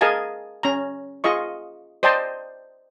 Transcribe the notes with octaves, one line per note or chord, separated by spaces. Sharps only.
G#4 A#4 D#5 F5 G#5 A5
C#4 A#5
F4 G#4 D#5 C#6
C5 D5 D#5 G5 A5 C6